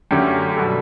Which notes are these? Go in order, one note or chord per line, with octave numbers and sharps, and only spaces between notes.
F#2 D3 A3 C#4 G4
G4
B2 G3 A4